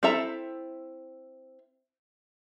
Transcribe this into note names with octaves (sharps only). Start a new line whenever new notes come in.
C4 E4 A4 E5 A#5